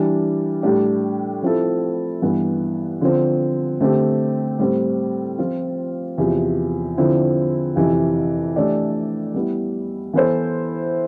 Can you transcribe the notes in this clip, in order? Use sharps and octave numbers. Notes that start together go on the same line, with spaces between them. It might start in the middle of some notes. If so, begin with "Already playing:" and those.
Already playing: E3 G3 D4
A2 G3 D4 G4
F3 C4 E4 A4
G2 E3 B3
D3 F3 C4
D3 A3 C4 G4
A2 G3 C4
F3 C4 F4
E2 C3 F3
D3 F3 C4 E4
F2 C3 E3
E3 A3 D4 G4 D5
G3 B3 E4
E3 B3 E4 A4 C5